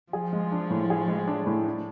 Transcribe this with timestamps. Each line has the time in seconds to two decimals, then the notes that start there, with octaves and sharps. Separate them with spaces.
0.13 F3 G#4
0.33 G#3
0.52 D4
0.70 A2
0.90 G#4
1.08 G#3
1.27 D4
1.46 A2
1.66 D4